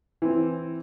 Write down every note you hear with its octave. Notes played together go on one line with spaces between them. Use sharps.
E3 C4